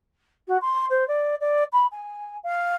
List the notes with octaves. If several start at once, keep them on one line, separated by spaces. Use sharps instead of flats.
F#4
C6
C5
D5
D5
B5
G#5
F5